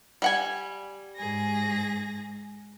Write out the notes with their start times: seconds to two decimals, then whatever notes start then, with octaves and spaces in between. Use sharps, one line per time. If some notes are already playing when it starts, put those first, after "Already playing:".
0.22 G3 F#5 G#5
1.17 G#2 G#4 A#6